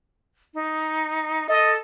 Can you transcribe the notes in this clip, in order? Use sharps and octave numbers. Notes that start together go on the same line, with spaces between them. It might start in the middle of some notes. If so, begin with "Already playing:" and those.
D#4
A4 D#5